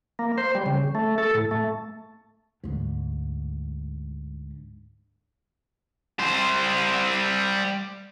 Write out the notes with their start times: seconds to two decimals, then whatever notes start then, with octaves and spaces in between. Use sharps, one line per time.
0.19 A#3
0.38 C5
0.55 G3
0.66 C#3
0.95 A3
1.18 A4
1.34 A2
1.51 A3
2.64 D2 G#2
6.19 G3 C5